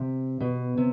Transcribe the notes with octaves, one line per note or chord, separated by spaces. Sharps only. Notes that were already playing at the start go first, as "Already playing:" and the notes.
Already playing: C3
B2
C3